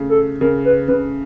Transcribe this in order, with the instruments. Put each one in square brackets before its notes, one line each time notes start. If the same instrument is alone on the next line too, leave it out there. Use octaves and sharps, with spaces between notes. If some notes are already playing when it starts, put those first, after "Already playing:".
Already playing: [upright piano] C#3 A3
[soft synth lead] A4
[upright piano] C#3 [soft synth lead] A#4
[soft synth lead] B4
[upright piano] C#3 [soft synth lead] B4